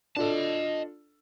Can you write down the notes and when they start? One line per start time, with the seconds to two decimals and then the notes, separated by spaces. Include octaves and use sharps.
0.16 D4 F4 A4 D#5 A5